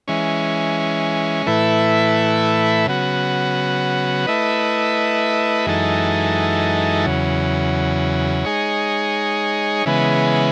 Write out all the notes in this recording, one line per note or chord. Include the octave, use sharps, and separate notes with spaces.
E3 G#3 C#4
A2 E3 A3 E4 B4
C#3 F#3 B3 F#4
A3 E4 B4 D#5
F#2 E3 G#3 D#4 A4
E2 C#3 F#3
G#3 D#4 G#4 C#5
C#3 E3 G#3 B3